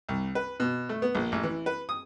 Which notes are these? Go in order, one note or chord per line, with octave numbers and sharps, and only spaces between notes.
C2
B4
B2
A3
B3
A#1
A1
E3
B4
D#6